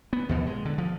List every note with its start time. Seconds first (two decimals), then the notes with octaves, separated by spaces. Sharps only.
0.13 B3
0.29 D#2 B2 F3
0.47 G#3
0.65 D3
0.78 F3